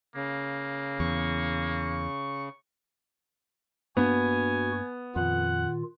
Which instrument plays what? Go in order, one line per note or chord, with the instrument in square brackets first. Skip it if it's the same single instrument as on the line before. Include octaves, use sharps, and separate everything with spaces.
[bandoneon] C#3 [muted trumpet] A#3
[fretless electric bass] E2 [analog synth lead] C#6
[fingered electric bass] G2 A#3 D4 [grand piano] B3 [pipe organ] F#4 [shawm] G#5
[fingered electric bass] F2 [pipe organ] A#2 D#3 F4 [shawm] F#5